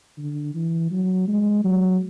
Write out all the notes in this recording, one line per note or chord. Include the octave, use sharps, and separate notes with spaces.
D3
E3
F#3
G#3
F#3